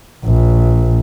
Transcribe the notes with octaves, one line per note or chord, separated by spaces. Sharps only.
A#1